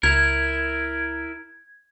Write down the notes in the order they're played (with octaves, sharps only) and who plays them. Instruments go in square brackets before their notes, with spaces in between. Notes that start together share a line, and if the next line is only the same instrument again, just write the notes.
[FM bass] C#2 [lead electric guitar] E4 A#4 [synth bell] G#6